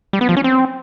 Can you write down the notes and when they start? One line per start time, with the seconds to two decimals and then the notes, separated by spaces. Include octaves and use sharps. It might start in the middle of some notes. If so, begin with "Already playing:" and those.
0.13 G3
0.21 B3
0.29 F3
0.37 C#4
0.44 C4